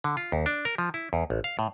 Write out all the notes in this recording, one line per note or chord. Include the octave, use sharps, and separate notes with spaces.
D3
F4
D#2
D4
A#4
F3
E4
E2
A1
F5
A2